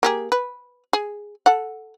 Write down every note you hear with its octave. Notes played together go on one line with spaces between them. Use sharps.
A#3 G4 G#4
B4
G#4
A4 F#5